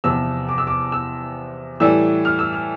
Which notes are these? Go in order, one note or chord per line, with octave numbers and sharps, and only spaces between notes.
E2 C3 F3 E6
D6
E6
D6
E6
A2 E3 G3 E6
F6
E6
F6